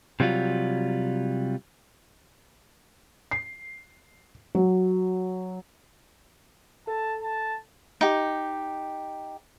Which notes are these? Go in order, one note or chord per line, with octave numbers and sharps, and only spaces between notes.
C3 F#3 G3 F4
C7
F#3
A4 A5
A5
D#4 G4